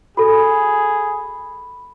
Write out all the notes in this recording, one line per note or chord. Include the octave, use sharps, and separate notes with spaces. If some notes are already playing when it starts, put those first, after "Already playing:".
F#4 G#4 A4 B5